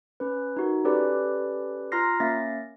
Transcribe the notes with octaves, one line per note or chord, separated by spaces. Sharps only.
C#4 B4
D#4 F#4 A#4
C#4 G4 A4 B4 D5
F4 A#5 C6 F6 A#6 C7
A#3 C#4 E5 F5 A6 A#6